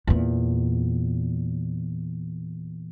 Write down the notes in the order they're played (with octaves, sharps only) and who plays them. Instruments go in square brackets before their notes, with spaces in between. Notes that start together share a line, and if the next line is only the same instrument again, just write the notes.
[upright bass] E2 A#2